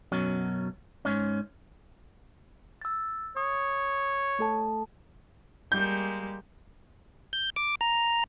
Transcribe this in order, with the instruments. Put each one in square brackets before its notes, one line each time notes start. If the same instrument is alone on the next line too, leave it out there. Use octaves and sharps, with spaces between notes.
[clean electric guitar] F#2 B2 F#3 C#4
G#2 C#4
[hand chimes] E6 A6
[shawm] C#5 [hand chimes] D#6
[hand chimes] A3 A4 A5
[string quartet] G3 G#3 A#3 [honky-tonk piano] G6
[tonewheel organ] G6
D6
A#5